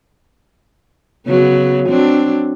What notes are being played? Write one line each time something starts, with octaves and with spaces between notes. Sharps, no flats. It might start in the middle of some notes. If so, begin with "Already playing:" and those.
C#3 F#3 B3
F#3 C4 D4